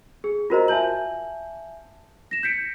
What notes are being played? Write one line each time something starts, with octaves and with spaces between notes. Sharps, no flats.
G#4
F4 F#4 A#4 C5 D#5 A#5
E5 G#5 A5 G6 F#7
A#6 E7
G6 B6 C#7 D7